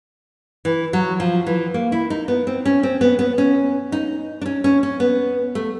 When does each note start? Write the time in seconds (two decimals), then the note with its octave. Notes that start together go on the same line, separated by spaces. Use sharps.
0.65 E3
0.93 F#3
1.20 F3
1.47 E3
1.74 A#3
1.92 E4
2.10 D#4
2.28 B3
2.47 C4
2.65 C#4
2.83 C4
3.01 B3
3.19 B3
3.38 C#4
3.92 D#4
4.41 D4
4.46 C#4
4.64 C#4
4.83 C#4
5.00 B3
5.55 A3